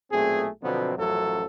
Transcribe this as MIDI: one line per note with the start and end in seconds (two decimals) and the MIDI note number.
0.12 0.47 35
0.12 0.47 46
0.12 0.47 57
0.12 0.47 60
0.12 0.47 68
0.63 0.94 47
0.63 0.94 50
0.63 0.94 53
0.63 0.94 54
0.63 0.94 59
0.63 0.94 60
0.96 1.46 33
0.96 1.46 42
0.96 1.46 53
0.96 1.46 54
0.96 1.46 57
0.96 1.46 69